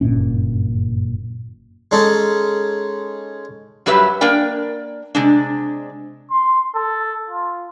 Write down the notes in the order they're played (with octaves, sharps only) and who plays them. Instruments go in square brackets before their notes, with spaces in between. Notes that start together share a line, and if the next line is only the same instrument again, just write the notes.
[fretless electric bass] F#1 G2 A#2 C#4
[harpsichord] G#3 C#4 D#4 A4
[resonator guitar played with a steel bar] F#2 F#3 G3 G4 B4 E5
A#3 D4 A#4 D5 G5
C3 G#3 D4
[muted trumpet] C6
A4
F4